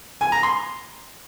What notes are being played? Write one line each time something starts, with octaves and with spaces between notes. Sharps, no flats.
G#5
A#5
C6